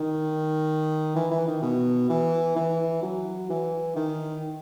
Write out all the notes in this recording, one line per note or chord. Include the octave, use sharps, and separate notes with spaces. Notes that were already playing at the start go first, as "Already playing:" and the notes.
Already playing: D#3
E3
E3
D#3
B2
E3
E3
F#3
E3
D#3